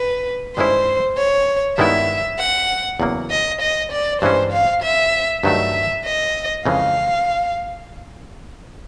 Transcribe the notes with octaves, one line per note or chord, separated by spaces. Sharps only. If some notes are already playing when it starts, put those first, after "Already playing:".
Already playing: B4
G2 D#3 G#3 C#4 E4 C5
C#5
G2 D#3 G#3 B3 E4 E5
F#5
E2 C#3 F#3 A#3
D#5
D#5
D5
G2 E3 G#3 C#4 C5
F5
E5
G2 D#3 F#3 A3 E5
D#5
F2 C#3 E3 G#3 F5